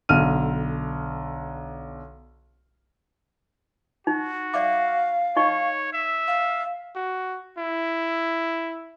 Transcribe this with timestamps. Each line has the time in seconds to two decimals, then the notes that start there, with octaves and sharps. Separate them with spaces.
0.09 B1 D3 F6 D#7
4.07 D#4 F#4
4.54 D5 E5 F5 D6
5.36 D#4 C#5 D#5 C#6
5.93 E5
6.28 F5
6.96 F#4
7.58 E4